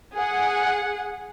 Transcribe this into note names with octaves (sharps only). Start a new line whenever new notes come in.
G#4 F#5